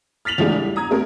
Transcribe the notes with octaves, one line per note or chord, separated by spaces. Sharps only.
F6 A6 B6 F7 F#7
E2 E3 F3 G#3 A3 D4
G3
A#5 D#6 G#6
A3 B3 C4 A#4